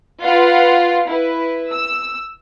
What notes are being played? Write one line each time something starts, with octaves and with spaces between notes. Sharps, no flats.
F4 B4 F5 F#5
E4 B4
E6